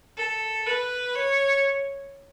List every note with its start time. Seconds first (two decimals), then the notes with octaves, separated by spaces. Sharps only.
0.16 A4
0.66 B4
1.15 C#5